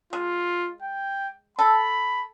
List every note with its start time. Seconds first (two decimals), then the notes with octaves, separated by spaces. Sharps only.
0.13 G#3 F4
0.82 G5
1.59 A4 B5